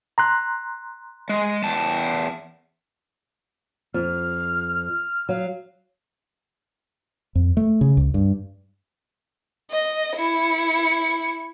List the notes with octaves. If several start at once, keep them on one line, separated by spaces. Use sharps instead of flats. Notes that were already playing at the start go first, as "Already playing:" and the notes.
A#5 C6 F#6
G#3
E2 A5
F2 F6
F#3 F5
F2
A3
C#3
C#2
G2
D#5
E4 C#7